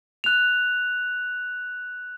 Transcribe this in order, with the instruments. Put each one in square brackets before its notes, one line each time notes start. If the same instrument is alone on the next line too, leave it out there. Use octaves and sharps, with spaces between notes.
[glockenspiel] F#6 F7